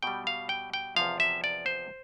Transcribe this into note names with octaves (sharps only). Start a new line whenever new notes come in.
B2 G3 G5
F5
G5
G5
E2 C3 F3 F5
E5
D5
C5